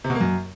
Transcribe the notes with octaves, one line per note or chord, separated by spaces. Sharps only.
C3
B2
A#3
F#2